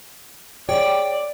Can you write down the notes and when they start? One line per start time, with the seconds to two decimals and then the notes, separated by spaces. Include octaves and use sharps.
0.69 G#4 C#5 D5 G5